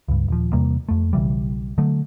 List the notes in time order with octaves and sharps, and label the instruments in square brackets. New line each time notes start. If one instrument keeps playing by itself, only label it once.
[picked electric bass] C#2 G2
D#1 F3
E2 C3 G3 A#3
F2 A3
B1 C#3 E3 G3
D3 F#3 A3